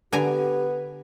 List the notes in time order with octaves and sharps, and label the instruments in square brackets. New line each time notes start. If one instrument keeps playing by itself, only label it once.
[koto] D3 G#5 A#5 [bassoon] B3 [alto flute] G4